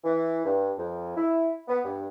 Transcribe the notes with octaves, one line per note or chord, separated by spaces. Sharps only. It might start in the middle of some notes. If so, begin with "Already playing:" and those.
E3
G2
F2
E4
B3
G2